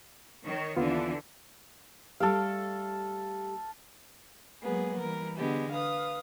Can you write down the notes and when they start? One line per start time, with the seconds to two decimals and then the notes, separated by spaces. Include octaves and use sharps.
0.45 D#3 C#5
0.77 D#2 D3 E3 B3 F4
2.20 G3 A3 G4 A4 F5
4.61 F#3 G#3 A#3 B3 G#4
5.00 E3 G3 A#4
5.38 D3 G#3 B3 G4
5.71 B4 F5 D#6